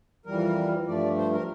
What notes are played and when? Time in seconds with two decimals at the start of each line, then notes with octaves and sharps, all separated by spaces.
0.26 F2 E3 G3 A#4
0.87 G2 F3 A3 D5
1.18 C5
1.33 A#4